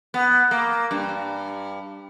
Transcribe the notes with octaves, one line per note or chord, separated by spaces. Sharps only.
B3
A#3
G2